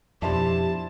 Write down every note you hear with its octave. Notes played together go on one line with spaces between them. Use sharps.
F2 B2 D4 E4 G4 C5 A5